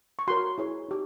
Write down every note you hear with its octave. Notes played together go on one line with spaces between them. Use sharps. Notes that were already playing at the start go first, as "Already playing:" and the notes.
C#6
F#4 A#4 C#5 C6
E4 G#4 C#5
D#4 G4